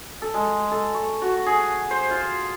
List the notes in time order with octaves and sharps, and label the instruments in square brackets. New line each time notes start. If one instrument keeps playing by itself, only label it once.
[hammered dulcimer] A4
G#3
A4
C#6
F#4
G#4
C5
F4